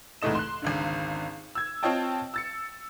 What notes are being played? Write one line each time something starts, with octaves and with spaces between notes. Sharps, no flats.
C2 G#2 E3 A3 D#5 E7
C6 F#6
G#1 C#2 D3
E6 G#6
C4 F4 C#5 D#5 G5 A5
E6 A6 C#7